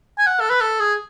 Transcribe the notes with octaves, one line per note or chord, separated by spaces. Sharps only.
G#5
F#5
A4
B4
A4
G#4